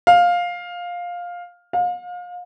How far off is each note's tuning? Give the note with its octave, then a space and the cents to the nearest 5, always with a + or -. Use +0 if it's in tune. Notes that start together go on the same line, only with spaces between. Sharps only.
F5 +10
F5 +35